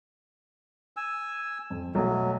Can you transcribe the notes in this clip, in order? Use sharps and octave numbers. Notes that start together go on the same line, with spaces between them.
G#5 E6
F2
B1 F#3 A3